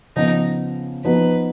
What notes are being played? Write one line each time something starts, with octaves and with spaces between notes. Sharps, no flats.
C#3 F3 B3 D#4
F3 B3 D#4 F#4 B4